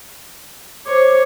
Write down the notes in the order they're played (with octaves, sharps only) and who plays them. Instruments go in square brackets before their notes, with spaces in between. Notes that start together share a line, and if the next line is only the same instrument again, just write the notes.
[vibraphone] C5 D6 [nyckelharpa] C#5